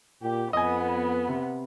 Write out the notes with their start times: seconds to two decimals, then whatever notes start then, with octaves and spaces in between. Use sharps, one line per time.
0.22 A#2 G4
0.53 F2 B3 D#5 G#5
1.28 C3